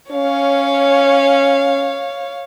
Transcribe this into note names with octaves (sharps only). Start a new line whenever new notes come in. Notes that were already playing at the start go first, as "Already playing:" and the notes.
C#4 C#5 F5